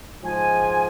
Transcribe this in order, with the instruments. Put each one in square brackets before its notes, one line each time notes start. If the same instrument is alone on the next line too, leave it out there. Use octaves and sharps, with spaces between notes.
[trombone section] G#2 F3 G#3 [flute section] G#5